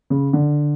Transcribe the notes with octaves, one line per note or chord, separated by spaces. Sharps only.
C#3
D3